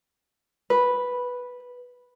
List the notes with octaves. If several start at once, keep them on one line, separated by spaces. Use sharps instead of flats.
B4